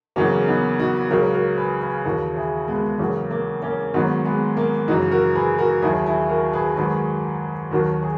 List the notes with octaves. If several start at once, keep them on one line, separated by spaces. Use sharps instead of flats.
E2 C#3 F#3 A#3 C#4
B3 D#4
D#4 F#4
C#2 C#3 F#3 F#4 A#4
F#4 A#4
G#4 B4
G#4 B4
D#2 C#3 E3 F#4 A#4
E4 G#4
G#3 B3
E2 C#3 F#3 A#3
A#3
A#3 C#4
G#2 D#3 F#3 B3 D#4
G#3 B3
A#3
F#2 C#3 E3 D#4 F#4
F#4 A#4
G#4 B4
F#4 A#4
D#2 D#3 F#3 E4 G#4
E4 G#4
F#4 A#4
G#4 B4
G#2 D#3 F#3 G#4 B4
D#2 D#3 F#3 F#4 A#4
G#4